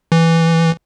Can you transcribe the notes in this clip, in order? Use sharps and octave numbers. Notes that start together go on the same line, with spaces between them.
E3